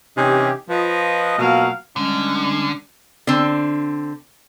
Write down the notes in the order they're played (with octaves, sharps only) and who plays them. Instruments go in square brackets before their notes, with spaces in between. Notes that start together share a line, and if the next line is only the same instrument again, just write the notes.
[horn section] C3 E3 C#4 D#4 G4
F3 B4 D#5
B2 F3 F#3 A#3 F5 F#5
[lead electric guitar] D3 [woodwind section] G3 G#3 C#4
[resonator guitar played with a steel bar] D3 C4